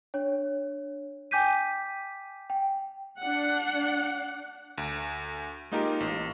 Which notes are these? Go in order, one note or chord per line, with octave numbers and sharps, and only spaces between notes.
D4 C#5
G5 G#5 D6 G6 B6 D#7
G5
D4 F#5
D2
G#3 A#3 D#4 F4 G4 A#4
A1